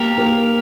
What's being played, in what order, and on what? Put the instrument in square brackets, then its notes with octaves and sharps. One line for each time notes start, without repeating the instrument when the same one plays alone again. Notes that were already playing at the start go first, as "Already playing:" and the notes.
Already playing: [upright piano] A#3 [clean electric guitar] G4 A#4
[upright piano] A#3